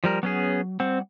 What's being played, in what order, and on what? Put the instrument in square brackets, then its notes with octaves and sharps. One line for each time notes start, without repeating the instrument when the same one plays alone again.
[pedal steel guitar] F3 G3 A#4
[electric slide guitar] F#3 [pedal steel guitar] B3 C#4 G#4
[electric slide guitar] G3 F#5 [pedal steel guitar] C4